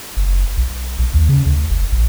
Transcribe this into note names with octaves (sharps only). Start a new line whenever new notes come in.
F#1
B1
B1
D#2
C#3
D2
F#1
A#1